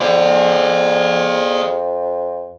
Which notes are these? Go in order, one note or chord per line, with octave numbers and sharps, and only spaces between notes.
F2 G#4 D5